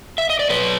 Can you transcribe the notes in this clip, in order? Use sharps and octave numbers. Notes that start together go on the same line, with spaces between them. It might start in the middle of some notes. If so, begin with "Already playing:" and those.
E5
D#5
D5
F#3 B4 C#5